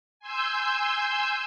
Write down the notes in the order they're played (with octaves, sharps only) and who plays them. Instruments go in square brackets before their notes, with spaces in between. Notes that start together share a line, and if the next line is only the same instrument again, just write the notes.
[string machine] G#5 C6 E6 G6